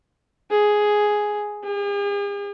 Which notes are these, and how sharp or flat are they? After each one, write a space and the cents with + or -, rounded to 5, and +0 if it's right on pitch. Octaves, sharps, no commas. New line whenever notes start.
G#4 +5
G#4 -45